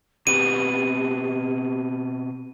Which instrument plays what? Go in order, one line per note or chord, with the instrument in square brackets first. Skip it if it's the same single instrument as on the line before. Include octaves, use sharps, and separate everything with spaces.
[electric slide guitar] B2 C4 B4 [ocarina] G4 [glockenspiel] D#7